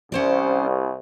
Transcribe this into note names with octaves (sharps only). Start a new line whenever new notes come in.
C2 C#4 C5 D5